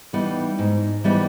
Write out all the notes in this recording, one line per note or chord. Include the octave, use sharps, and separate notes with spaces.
E3 G3 B3 D#4
G#2
E3 G3 B3 D#4